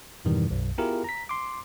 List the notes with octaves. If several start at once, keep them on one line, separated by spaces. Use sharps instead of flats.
F2 G#2 B2 D#3 E3 G3
B1 F#2
B3 E4 F4 G4 G#4 A#4
A#5 B6
C6 D6